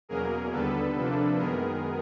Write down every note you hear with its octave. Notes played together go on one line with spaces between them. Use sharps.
E2 B2 F#3 A#3 C#4 G#4 A#4
D#2 D3 G3 B3 A4 B4
C3 F3 A#3 D4
F#2 D#3 G#3 B3 G#4 A#4